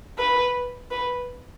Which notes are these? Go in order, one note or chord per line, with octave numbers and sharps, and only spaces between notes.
B4
B4